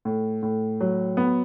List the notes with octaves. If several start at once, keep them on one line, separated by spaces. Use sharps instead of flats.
A2
A2
F#3
B3